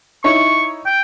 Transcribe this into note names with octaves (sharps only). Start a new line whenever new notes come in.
D#4 E4 C#5 C#6
G5